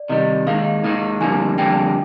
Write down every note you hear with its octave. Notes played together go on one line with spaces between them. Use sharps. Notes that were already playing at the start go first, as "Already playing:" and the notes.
Already playing: D5
C3 D#3 G3 D#5
D#2 D#3 G#3 D#4 F5
D#2 D#3 G#3 D#4
F2 D3 G3 A#3 G#5
F2 D3 G3 A#3 G5